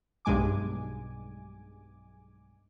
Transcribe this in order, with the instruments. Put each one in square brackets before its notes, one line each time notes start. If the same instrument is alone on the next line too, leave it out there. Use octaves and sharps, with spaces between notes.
[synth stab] B1 G2 G#3 G#5 D6